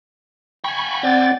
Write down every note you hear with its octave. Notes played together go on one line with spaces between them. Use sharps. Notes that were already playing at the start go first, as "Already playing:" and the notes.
G5 G#5 B5 C#6
C4 D5 F#5 A6